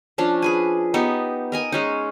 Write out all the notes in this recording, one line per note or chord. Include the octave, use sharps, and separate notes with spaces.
F3 C#4 D4
G#4 B4 G#5
B3 D#4 G4
A#4 D#5 G#5
G#3 C#4 D#4